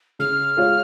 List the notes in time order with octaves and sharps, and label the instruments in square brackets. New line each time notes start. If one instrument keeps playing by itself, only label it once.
[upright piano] C#3 [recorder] F6
[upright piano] G#3 F4 C#5